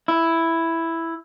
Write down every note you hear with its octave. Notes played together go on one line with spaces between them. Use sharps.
E4